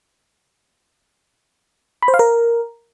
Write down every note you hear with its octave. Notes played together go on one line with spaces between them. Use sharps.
B5
C5
F5
A#4